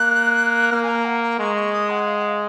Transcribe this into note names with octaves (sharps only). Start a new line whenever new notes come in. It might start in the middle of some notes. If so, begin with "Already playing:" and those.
Already playing: A#3 F#6
A#3 F6
G#5
A#5
F#5
A#5
G#3 C#6
C#6
D#6
F#5
F5
F#5
F5